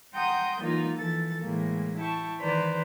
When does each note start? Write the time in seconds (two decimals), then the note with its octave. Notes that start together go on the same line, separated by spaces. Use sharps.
0.14 F#5 G5 A#5 C6 D#6 G6
0.60 E3 F#3 A#3 D#4 F4
0.95 E3 F3 A4 A6
1.40 A2 E3 G#3 A#3
1.97 E4 G5 A5 C#6
2.40 D#3 E3 B4 C5 D5 A#5